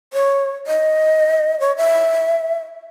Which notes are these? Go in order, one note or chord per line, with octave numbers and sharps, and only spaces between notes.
C#5
D#5
C#5
E5